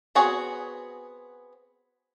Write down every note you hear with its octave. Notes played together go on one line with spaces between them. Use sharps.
B3 C4 F#4 G#4 C#5